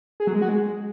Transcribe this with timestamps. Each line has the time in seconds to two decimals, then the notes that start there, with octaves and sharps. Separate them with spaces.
0.20 G#4
0.27 F#3
0.34 G#3
0.42 F#4
0.49 G#3